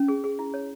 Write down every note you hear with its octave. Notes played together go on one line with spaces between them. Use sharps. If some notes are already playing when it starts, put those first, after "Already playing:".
Already playing: C#4
G#4
G#4
E4
C#5